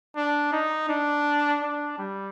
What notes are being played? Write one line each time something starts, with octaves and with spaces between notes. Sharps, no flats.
D4
D#4
D4
D4
G3